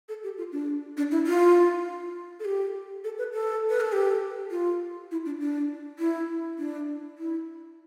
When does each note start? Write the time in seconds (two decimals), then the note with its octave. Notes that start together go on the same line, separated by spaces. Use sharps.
0.09 A4
0.23 G4
0.38 F4
0.52 D4
0.97 D4
1.11 E4
1.27 F4
2.40 A4
2.45 G4
3.04 A4
3.18 B4
3.33 A4
3.69 B4
3.80 A4
3.93 G4
4.51 F4
5.11 E4
5.25 D4
5.41 D4
5.99 E4
6.59 D4
7.18 E4